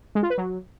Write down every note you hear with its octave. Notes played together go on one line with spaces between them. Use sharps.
G#3
F4
B4
F#3